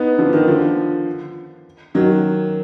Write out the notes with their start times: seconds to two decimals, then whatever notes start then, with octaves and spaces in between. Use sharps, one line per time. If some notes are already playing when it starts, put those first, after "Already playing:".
Already playing: B3 D#4
0.18 D3 F3
0.33 D#3
0.48 D3 F3
1.94 D#3 F#3